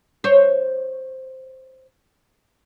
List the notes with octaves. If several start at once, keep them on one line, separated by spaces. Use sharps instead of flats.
C5 C#5